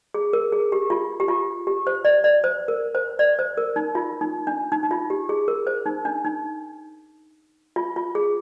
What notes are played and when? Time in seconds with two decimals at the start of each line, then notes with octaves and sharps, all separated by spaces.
0.14 G#4
0.33 A#4
0.52 G#4
0.72 G4
0.90 F4
1.20 G4
1.28 F4
1.67 G4
1.87 C5
2.05 D5
2.24 D5
2.44 C5
2.68 A#4
2.95 C5
3.19 D5
3.39 C5
3.58 A#4
3.76 D#4
3.95 F4
4.21 D#4
4.47 D4
4.72 D#4
4.83 D#4
4.91 F4
5.10 G4
5.29 G#4
5.48 A#4
5.67 C5
5.86 D#4
6.05 D4
6.25 D#4
7.76 F4
7.96 F4
8.15 G#4